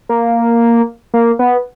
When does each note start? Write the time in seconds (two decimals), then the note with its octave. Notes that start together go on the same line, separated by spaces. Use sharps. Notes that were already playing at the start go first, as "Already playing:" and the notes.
0.09 A#3
1.14 A#3
1.39 B3